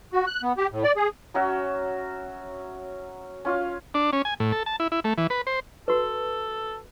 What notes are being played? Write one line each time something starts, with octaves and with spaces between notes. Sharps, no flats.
F#4
F#6
B3
G4
A2
D5
G#4
F#3 C#4 F#4 E5
C#4 F4 F5
D4
C#4
G#5
A2
A4
A5
E4
E4
A3
E3
B4
C5
F#4 A4 B4